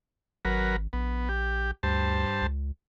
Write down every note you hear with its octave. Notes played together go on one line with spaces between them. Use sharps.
G#1 F#3 A#4 B4
A#1 B3
G4
D2 G2 C5 A5
C#2